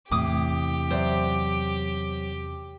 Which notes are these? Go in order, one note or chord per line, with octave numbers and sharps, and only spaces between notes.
E2 A2 C3 G4 D6 D#6
F#3 C5 D5 E5